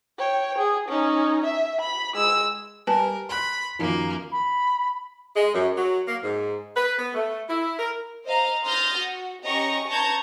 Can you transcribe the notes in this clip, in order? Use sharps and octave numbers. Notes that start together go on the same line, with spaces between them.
C#5 G5
G#4
C#4 D#4
E5
B5
G#3 E6
G3 A#4 B4 G#5 A5
B5 C6 F#6
F#2 D#3 F3 A#3
B5
G#3
F#2
F#3
A#3
G#2
B4
B3
A3
E4
A#4
C5 D#5 F5 A#5
C6 D#6 F6 G6 A6 A#6
F#4
C#4 G4 D#5 A#5 C#6
B4 A5 A#5 C#6 G6 G#6